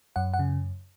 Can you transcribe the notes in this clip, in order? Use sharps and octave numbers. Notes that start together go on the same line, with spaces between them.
F#2 F#5
F#5
C#3